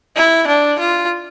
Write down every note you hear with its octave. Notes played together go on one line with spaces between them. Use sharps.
E4
D4
F4